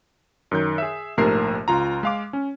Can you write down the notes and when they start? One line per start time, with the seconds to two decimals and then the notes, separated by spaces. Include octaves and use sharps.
0.51 F#2 D#3 G6
0.78 G#4 E5
1.17 A#1 G#2 C3 A3 A#4 C7
1.68 C#2 F4 A#5
2.03 G#3 F5 D6
2.33 C#4